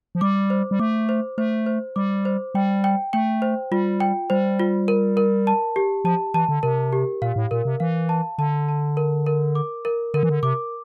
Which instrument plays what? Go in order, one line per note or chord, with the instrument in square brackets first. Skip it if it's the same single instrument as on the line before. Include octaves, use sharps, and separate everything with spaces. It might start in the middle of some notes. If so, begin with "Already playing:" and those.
[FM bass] F3
[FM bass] G3 [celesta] D6
[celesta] C5
[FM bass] G3
[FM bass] A3 [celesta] D6
[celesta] C5
[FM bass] A3 [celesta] C5
[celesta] C5
[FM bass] G3 [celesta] D6
[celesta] C5
[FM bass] G3 [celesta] G5
[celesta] G5
[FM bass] A3 [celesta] G5
[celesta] C5
[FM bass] G3 [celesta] F4
[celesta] G5
[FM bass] G3 [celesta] C5
[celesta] F4
A#4
A#4
A5
G4
[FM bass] F3 [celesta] A5
[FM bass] E3 [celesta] A5
[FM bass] D3
[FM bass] C3 [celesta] A#4
[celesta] G4
[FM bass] A#2 [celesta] F5
[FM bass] A2
[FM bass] A#2 [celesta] A#4
[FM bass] C3
[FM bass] E3 [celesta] F5
[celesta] A5
[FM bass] D3 [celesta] A5
[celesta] A5
A#4
A#4
D6
A#4
[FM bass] D3 [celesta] A#4
[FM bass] E3
D3
[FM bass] C3 [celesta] D6